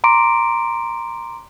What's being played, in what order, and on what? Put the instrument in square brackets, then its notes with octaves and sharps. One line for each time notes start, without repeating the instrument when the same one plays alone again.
[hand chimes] A#5 C6 D6 D7